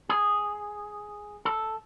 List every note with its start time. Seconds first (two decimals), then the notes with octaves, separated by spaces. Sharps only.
0.09 G#4
1.45 A4